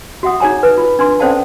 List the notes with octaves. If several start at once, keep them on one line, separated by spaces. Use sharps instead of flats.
F#4 E5 F#5 D#6
D#4 G#4 C#5 G#5 A#5
B4
F4
D4 B4 C6
C#4 A4 C5 D5 F5 A5